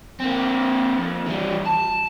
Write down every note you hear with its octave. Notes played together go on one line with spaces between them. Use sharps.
A#3 C4
F2
E3 G3
A5